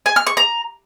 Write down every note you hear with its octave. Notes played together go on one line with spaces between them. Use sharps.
G#5
F6
C#6
A#5